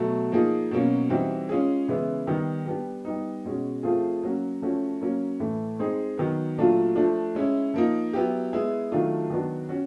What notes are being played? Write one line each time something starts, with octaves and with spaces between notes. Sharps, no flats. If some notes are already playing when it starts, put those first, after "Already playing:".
Already playing: B2 F#3 A3
F3 A#3 D#4 G#4
B2 F#3 A#3 C#4
E3 G3 C4 D#4 F#4
G#3 C#4 F4 G#4
C#3 E3 G#3 B3 E4
D#3 G3 B3 D#4
G3 B3 D4 G4
G3 B3 D#4
B2 G#3 C#4 F#4
F3 A3 C4 F4 G#4
F#3 A#3 C#4 F#4
F3 A3 C#4 F#4
F#3 A#3 C#4
A2 E3 A3
G#3 C4 D#4 G#4
D#3 F#3 B3
A#2 F#3 A3 D4 F4
F3 A3 D4
G#3 C#4 E4
F3 A#3 D#4
F#3 B3 E4 G4
G#3 B3 E4 G#4
D#3 F#3 A3 D4 F4
D#3 F#3 B3 D4 F#4
C#4 F#4